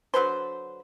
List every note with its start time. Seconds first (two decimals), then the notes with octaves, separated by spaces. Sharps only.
0.14 D3 F#3 B4 C5